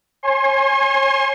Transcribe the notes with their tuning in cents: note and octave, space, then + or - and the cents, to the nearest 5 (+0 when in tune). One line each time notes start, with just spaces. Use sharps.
C#5 -35 G#5 +0 C6 +35